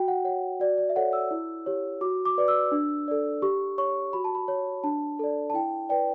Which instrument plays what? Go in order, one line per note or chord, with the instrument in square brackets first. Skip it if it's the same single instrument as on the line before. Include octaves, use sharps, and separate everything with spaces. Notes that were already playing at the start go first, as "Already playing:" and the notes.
Already playing: [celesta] F#4 G5
F#5
C#5 F#5
F#4 D5
D5
E5
A4 C#5 F#5
E6
E4
G4 C#5
F#4 D6
D6
B4 D5
E6
D4
A4 D5
G4 C#6
C#5 C#6
F#4 B5
A5
B5
C#5
D4 A5
A4 D5
A5
E4 G5
B4 D5 G5